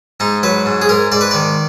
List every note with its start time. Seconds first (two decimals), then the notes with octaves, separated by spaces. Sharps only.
0.20 G#2 D#4
0.43 F#3 B4
0.66 G#2
0.82 G#4
0.89 G#2 A#4
1.12 G#2 D5
1.21 B4
1.31 D#3 D5